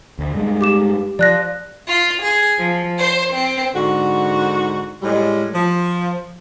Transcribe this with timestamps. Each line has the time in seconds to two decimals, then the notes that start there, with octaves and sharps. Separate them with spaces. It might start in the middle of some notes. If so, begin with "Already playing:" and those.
0.19 D2
0.35 G2 G3 G#3
0.61 G4 D6 E7
1.19 F3 D5 F#6 A#6
1.88 F4
2.24 G#4
2.60 F3
3.00 C5
3.33 C4
3.74 G#2 D3 F#4
5.01 A2 G3 G#3
5.54 F3